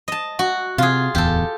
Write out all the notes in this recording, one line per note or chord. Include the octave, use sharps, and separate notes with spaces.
D#5 A5
F#4
C3 F4 G#4
D1 E2 G4 A4